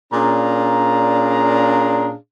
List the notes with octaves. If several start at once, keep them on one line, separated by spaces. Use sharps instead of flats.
A#2 C#4 D4 G#4 F5 A#5